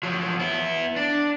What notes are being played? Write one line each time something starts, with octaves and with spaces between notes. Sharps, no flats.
F3 F#3
B3 E4
D4